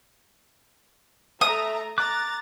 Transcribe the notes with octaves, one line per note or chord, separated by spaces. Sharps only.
A3 E5 A#5 D#6
A#5 D6 F#6 A6